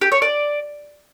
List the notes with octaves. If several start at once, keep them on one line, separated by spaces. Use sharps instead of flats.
G4
C#5
D5